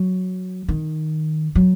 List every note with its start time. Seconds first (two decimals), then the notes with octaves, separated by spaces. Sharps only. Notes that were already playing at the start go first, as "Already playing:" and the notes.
Already playing: F#3
0.68 D#3
1.55 F#3